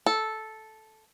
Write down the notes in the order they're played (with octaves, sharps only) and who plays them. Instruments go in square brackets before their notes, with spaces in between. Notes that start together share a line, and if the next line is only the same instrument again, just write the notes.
[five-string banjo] A4